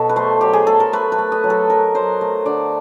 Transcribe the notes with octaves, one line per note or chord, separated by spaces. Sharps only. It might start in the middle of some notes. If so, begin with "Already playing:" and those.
Already playing: B2 F#3 A4
B4
A3 C5
F#3 G4
G#4
A3 A4
A#4
A3 B4
B4
A3
D#5
F#3
A4
F#3 A#4
F#3 C5
A3
D3 D5